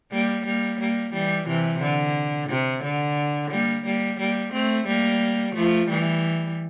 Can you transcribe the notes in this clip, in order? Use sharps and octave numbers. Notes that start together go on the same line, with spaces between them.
G3 A#3
G3 A#3
G3 A#3
E3 G3
C3 E3
D3
C3
D3
G3 A#3
G3 A#3
G3 A#3
A3 C4
G3 A#3
F3 A3
E3 G3